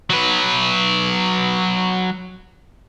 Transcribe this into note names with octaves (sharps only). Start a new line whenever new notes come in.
F#3 B4